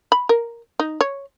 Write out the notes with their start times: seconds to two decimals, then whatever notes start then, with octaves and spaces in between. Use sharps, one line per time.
0.12 B5
0.29 A#4
0.79 D#4
1.01 C#5